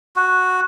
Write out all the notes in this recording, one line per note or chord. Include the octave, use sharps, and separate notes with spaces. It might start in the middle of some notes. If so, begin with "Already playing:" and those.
F#4